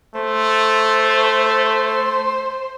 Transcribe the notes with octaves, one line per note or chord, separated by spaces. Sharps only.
A3 C5